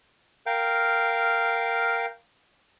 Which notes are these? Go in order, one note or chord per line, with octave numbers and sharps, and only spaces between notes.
A#4 F5 G5